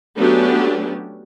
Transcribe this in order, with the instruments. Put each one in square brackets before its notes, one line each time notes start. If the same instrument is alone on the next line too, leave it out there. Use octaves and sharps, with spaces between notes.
[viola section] F#3 A3 B3 C#4 D4 G4